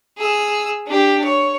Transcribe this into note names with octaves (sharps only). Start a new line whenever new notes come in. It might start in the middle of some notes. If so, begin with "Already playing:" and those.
G#4 E6
D4 G4
C#5